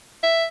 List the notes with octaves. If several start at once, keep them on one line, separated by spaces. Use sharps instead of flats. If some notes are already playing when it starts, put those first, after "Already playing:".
E5